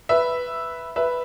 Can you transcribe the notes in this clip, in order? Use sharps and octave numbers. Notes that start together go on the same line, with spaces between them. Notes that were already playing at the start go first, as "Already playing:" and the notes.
B4 E5
B4 E5